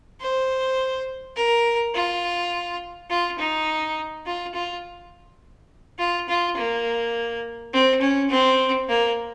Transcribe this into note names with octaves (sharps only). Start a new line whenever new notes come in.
C5
A#4
F4
F4
D#4
F4
F4
F4
F4
A#3
C4
C#4
C4
A#3